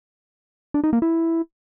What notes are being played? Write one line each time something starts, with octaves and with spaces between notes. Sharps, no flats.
D4
D#4
A#3
E4